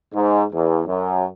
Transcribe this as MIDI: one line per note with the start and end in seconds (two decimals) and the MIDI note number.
0.14 0.42 44
0.52 0.81 40
0.86 1.26 42